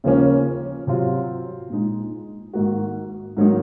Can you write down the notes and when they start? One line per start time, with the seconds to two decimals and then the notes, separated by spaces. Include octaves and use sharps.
0.04 D#2 C#3 F3 A#3 C#4
0.87 C3 F#3 C4 F4
1.70 A#2 G#3 D#4
2.53 G#2 D#3 A#3 D#4 F#4
3.37 G#2 D#3 F#3 A#3 D#4